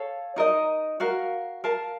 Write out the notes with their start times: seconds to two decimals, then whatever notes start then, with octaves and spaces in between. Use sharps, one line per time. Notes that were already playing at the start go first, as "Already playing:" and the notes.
Already playing: A4 C#5 F5
0.36 D#4 A#4 D#5
1.00 F#4 A#4 F5
1.64 A#4 F5 A5